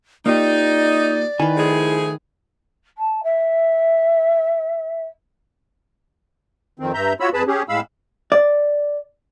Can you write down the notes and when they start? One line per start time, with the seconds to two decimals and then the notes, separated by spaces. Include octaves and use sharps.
0.26 A#3 D#4 F4 G4 D5
1.40 D#3 E4 B4 G#5
1.57 F3 A3 G#4
2.97 A5
3.23 E5
6.79 F2 D#3 C4
6.94 G2 E5 A#5 G6
7.20 F4 F#4 C#5 B5 E6
7.34 F2 G#4 B4 A5 B5
7.47 C#4 G4 G#4
7.69 A2 G#3 F5 B5 E6
8.32 D5